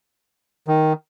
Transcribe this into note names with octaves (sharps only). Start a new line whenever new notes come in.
D#3